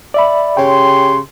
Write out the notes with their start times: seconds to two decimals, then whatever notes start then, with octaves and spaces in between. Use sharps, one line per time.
0.14 D5 E5 B5
0.57 C#3 G4 C#5 G5 C6